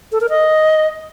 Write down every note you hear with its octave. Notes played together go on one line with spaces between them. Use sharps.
A4
A#4
D#5